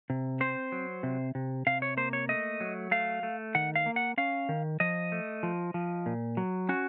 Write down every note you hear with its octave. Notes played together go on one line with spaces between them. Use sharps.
C3
C4 C5
F#3
C3
C3
C3 F5
C#5
A#3 C5
C#5
A3 D#5
F#3
A3 F5
A3
D#3 F#5
F5
A#3
F#5
C#4 F5
D#3
F3 D#5
A3
F3
F3
A#2
F#3
C#4 F#4